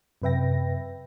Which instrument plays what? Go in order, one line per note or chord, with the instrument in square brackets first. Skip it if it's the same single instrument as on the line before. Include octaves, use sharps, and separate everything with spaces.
[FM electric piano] F#2 C3 B4 E5 G5 A#6